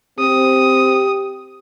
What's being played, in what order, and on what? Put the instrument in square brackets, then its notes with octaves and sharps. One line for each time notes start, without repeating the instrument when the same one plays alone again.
[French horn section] C4 [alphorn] G4 [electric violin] D#6